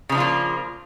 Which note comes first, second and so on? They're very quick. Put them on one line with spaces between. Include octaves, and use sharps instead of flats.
C#3 F3 D4 F4 A#3